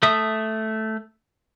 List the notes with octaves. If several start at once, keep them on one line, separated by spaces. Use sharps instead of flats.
A3 A4 E5 D#6